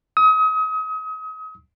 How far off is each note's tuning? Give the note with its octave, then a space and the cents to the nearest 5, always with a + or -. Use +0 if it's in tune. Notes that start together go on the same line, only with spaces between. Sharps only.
D#6 +35